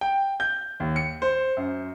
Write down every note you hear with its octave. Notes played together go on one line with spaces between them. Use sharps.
G5
G6
D#2
C#7
C5
F#2